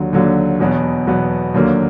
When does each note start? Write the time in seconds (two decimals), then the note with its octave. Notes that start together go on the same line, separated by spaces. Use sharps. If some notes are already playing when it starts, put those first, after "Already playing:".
Already playing: D#2 D3 F#3
0.13 D#2 D3 F#3
0.60 E2 B2 F#3 B3
1.07 E2 B2 F#3 B3
1.54 D#2 D3 F#3 A#3